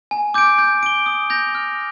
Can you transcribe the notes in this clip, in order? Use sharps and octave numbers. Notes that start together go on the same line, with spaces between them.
G#5
D6 G6 D7
G6
D7 G7
D#6
G6 A#6 F7
F6